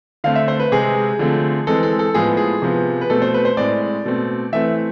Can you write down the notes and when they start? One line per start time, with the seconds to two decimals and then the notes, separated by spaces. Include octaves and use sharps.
0.24 D3 A3 C4 F5
0.36 E5
0.48 C5
0.60 B4
0.72 C3 G#3 C4 G#4
1.19 D3 F3 A3 C4
1.67 E3 G#3 C4 A4
1.83 A4
1.99 A4
2.14 A2 F3 G#3 B3 G#4
2.37 G#4
2.62 C3 F3 B3
3.01 B4
3.10 B2 A3 C4 A4
3.22 C5
3.34 B4
3.45 C5
3.57 A2 G#3 C4 D5
4.05 B2 A3 C4
4.53 E3 A3 C4 E5